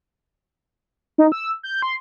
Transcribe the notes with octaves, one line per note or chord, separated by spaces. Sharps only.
D#4
E6
G6
C6